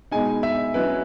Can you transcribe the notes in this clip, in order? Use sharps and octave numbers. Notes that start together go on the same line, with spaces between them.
B2 G#3 D#4 G#5
E5
F#3 C#4 E4 B4